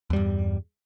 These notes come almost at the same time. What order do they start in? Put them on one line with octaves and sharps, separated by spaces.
E2 G3 G2